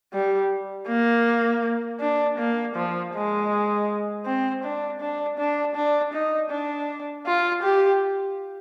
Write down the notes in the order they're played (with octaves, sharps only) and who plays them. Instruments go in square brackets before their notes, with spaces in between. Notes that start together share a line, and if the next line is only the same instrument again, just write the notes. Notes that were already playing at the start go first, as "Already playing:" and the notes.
[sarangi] G3
A#3
D4
A#3
F3
G#3
C4
D4
D4
D4
D4
D#4
D4
F4
G4